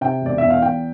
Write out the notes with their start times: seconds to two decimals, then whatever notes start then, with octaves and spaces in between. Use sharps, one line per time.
0.01 C3 G5
0.22 E1 D5
0.38 E2 E5
0.50 F5
0.62 E2 G5